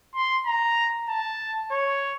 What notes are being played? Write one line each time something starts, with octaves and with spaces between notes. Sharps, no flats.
C6
A#5
A5
C#5